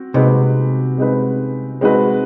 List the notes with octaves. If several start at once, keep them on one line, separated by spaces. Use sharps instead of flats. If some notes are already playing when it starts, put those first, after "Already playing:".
Already playing: C4 F#4
C3 G#3 C4 D#4 F#4 B4
G#3 C4 D#4 F#4 B4
G#3 C4 D#4 F#4 B4